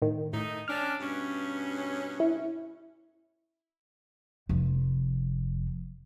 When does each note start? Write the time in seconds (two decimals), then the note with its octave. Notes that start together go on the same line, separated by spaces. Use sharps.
0.02 A2 D#3
0.33 A2 D#3 A3 D#4
0.68 C#4 D4 F6
1.00 G2 B2 C#4
2.20 E4
4.49 F1 F3